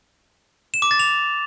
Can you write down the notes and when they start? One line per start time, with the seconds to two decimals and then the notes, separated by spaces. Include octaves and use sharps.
0.74 E7
0.82 D6
0.91 A6
0.99 F7